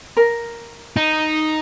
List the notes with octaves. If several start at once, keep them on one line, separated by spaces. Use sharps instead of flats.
A#4
D#4